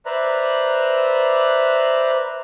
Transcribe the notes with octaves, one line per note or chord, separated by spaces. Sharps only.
B4 C5 D5 E5 A#5 F#6